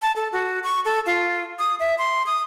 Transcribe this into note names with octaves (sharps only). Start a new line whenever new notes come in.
A5
A4
F#4
C#6
A4
F4
D#6
E5
C6
D#6